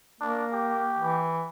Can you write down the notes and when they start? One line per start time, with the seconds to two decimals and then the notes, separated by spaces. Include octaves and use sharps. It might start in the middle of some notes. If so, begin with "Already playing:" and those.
0.21 A#3 D4
0.52 G4
0.98 E3